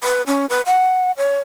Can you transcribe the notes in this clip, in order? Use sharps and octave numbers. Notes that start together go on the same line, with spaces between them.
B4
C#4
B4
F#5
C#5